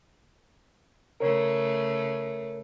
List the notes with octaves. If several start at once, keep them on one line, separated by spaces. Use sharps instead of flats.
C#3 A3 A#4 C#5